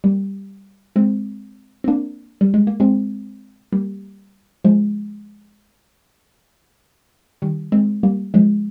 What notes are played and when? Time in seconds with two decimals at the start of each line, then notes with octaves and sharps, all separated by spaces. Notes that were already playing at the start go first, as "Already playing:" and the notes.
0.04 G3 A#3
0.96 G#3 C4
1.84 C4
1.88 A#3 D4
2.41 G3
2.54 G#3
2.67 A#3
2.80 G#3 C4
3.72 G3 A#3
4.64 F3 G#3
7.42 D#3 G3
7.72 G#3 C4
8.03 G3 A#3
8.34 F3 G#3